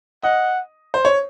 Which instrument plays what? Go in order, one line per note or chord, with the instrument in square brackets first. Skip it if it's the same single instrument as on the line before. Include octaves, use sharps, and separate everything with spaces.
[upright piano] D#5 [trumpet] F#5
[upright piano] C5
C#5